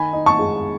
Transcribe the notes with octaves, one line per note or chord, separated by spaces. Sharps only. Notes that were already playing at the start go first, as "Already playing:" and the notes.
Already playing: D#3 G#5 B5
D#4
A5 C#6
G#3